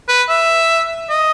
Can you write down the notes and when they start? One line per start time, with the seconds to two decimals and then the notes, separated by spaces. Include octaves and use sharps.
0.08 B4
0.29 E5
1.09 D#5